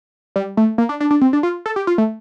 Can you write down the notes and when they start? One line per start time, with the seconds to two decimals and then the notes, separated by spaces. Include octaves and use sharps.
0.36 G3
0.57 A3
0.78 A#3
0.89 D4
1.00 D4
1.11 D4
1.21 C4
1.33 D4
1.43 F4
1.66 A4
1.76 G4
1.87 F4
1.98 A3